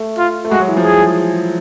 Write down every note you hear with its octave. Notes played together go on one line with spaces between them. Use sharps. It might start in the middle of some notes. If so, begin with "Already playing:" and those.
Already playing: A3
F4
A3
G#3 F#4
F#3
E3
F3
G#4